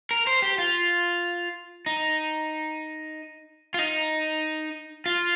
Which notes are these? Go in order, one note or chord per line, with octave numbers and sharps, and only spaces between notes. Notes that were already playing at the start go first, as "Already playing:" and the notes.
A#4
C5
G4
F4
D#4
F4
D#4
F4